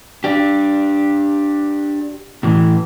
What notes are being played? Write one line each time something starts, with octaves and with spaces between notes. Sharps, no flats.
D4 G4
A2 E3